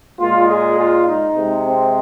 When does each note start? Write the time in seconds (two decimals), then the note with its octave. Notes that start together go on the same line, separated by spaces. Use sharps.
0.17 A#2 G#3 F4
0.47 G#4
0.76 F4
1.06 D#4
1.35 C3 G#3
1.65 C4